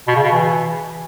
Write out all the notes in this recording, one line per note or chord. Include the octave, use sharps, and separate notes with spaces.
B2
C#3
B2
E3